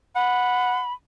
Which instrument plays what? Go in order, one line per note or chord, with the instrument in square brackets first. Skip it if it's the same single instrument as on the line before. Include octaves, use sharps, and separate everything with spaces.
[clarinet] F#5 [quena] B5